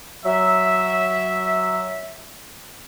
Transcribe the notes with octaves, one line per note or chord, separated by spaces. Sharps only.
F#3 E5